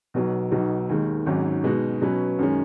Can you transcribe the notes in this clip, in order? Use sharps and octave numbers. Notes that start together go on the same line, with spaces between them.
B1 B2 F#3
B1 B2 F#3 D#4
D#2 D#3 G#3
G#1 G#2 D#3 F#3 C#4
B2 G#3 D#4 F#4
B2 F#3 C#4 B4
F#2 D#3 G#3 C#4